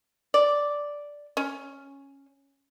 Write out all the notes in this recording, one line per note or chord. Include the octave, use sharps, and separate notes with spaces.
D5
C#4